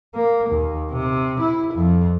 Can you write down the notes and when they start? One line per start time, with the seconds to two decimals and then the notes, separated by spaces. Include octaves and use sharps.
0.15 A#3
0.50 D#2
0.91 C3
1.41 E4
1.74 F2